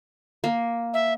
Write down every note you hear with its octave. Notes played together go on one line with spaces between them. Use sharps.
A#3
E5